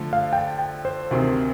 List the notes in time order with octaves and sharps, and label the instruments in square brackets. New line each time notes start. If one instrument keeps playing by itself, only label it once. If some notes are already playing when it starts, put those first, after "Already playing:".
Already playing: [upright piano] D3 F3 A3
[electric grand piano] F5
G5
G5
C5
[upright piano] D2 C3 D#3